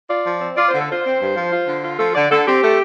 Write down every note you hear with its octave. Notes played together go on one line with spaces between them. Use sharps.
F4 D5
F3
C4
F4 D5
D3 C5
A4
F4 C5
C4
G2
F3
F4
D3
F4
F3 A4
D3 D5
D3 A4
C4 G4
A3